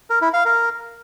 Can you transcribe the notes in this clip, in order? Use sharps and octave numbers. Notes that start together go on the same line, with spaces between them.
A#4
E4
F5
A#4